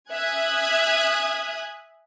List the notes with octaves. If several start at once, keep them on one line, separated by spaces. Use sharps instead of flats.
E5 G#5 D#6 F#6 G#6